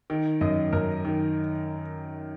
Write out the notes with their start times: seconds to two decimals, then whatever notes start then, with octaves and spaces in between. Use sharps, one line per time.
0.10 D#3
0.41 F#2 D#5
0.73 F#2 A#4
1.05 D#3